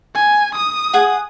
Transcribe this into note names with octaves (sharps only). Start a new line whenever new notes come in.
G#5
D#6
G#4 F#5